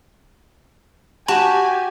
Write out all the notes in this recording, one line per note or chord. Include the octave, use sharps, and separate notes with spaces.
F#4 G4 G#5 A5